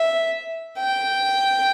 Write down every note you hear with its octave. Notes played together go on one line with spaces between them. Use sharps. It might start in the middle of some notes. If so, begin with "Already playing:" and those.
Already playing: E5
G5